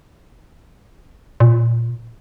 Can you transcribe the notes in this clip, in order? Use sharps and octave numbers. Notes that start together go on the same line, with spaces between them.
A#2